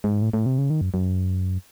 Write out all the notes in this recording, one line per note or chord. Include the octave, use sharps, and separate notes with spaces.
G#2
A2
A2
C3
C#3
D#3
F#2
F#2